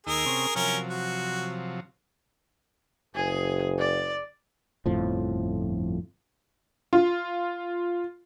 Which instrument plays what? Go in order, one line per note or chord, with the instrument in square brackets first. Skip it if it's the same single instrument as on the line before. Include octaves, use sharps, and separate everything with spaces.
[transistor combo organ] D#2 D#4 E6 [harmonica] G#4 A#4
[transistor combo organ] C3 C4 C#4
[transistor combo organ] C3 F3 F#3 [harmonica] C#4 A#4
[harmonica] F#4
[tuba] F#1 [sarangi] G#4
[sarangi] D5
[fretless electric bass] G1 F2 A2 F3
[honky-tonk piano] F4